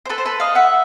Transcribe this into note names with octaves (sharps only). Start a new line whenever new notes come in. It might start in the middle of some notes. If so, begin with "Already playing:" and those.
C5
A4 B4
C5
A4 B4
D#5 F5
E5 F#5